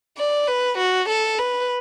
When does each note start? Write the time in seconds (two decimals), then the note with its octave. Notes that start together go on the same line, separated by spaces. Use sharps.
0.18 D5
0.47 B4
0.78 F#4
1.09 A4
1.39 B4